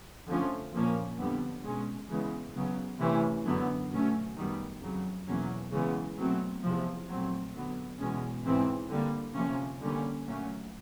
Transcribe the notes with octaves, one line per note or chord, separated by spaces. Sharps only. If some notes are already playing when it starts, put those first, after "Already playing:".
F2 D3 F3 A3 C#4
A#2 F3 A#3 C#4
F2 D3 G3 B3
B2 G#3 C#4
C#3 E3 G#3 B3
C#3 F#3 B3
C3 E3 A3 C#4
F#2 D3 F#3 B3
B2 F#3 A3 C#4
F#2 D#3 G3 B3
F2 C#3 F#3
E2 B2 F#3 A#3 C#4
C#3 E3 G#3 B3
B2 F#3 A3 C4
E2 C3 F3
A#2 F#3 A3 C4
D3 F#3 B3
E2 B2 G#3 C#4
G#2 E3 G#3 C4
D3 G3 A#3
C3 F3 A#3 C#4
D3 G3 A#3 C#4
A#2 F#3 A3 C#4